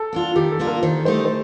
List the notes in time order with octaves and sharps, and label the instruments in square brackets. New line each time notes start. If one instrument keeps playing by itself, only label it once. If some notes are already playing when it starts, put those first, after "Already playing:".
Already playing: [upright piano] A4
[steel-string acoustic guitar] A#3 D4 F4
[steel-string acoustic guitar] D#3 [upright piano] G4
[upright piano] A4
[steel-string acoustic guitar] A#3 D4 F4
[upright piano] A#4
[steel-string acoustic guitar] D#3 [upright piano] C5
[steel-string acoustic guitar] A3 D#4 G4 [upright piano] C5
[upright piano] C5